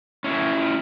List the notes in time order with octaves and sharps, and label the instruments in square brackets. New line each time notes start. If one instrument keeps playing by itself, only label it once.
[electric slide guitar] C#4 E4